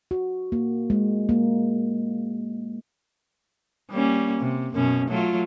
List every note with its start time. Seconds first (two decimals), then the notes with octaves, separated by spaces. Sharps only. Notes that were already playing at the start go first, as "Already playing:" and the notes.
0.11 F#4
0.52 A#3
0.90 G#3
1.29 A#3
3.91 G3 A#3 C#4
4.39 C3
4.74 F#2 B2 C#4
5.09 F#3 A3 F4